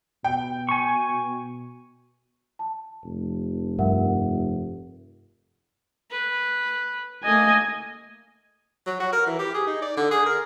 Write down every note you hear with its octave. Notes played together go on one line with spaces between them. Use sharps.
B2 G5
G#5 C#6
A5
F1
G2 A#4 E5 F#5
B4
A3 A#3 D#5 G#5
F#3
F#4
A#4
E3
G4
G#4
D#4
D5
D3
G#4
A#4